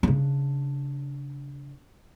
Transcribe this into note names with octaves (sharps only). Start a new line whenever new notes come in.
C#3 D4